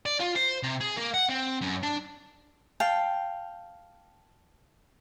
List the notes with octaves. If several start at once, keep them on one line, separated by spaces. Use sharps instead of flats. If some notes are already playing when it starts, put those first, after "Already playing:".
D5
F4
C5
C3
G#4
A#3
F#5
C4
F#2
D4
F5 G5 A5